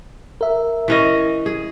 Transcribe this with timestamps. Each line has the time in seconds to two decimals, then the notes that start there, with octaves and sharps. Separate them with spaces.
0.41 A#4 E5
0.88 E3 C#4 D#5
1.46 G#4